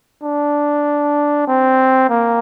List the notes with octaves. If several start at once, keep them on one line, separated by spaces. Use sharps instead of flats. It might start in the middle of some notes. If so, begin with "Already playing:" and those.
D4
C4
A#3